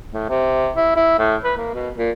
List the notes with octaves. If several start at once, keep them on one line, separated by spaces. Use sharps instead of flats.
A2
C3
E4
E4
A2
B4
A#3
B2
A#2